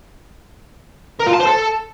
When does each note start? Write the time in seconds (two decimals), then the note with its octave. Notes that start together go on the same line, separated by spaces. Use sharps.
1.19 A#4
1.26 F4
1.33 A5
1.40 C5
1.46 A4